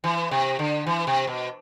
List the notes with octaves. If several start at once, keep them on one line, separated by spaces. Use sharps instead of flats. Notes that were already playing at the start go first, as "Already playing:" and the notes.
E3
C3
D3
E3
C3
B2